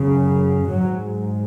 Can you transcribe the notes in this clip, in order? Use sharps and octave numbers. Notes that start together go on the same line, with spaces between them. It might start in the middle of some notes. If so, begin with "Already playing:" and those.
Already playing: F#2 C#3
G#2 F#3